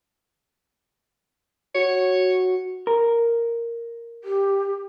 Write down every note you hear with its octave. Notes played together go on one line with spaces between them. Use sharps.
F#4 C#5
A#4
G4